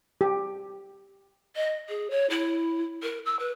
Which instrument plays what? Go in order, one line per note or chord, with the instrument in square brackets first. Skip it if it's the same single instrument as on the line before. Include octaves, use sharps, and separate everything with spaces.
[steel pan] G4
[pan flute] D#5
G#4
C#5
E4
A#4
E6
B4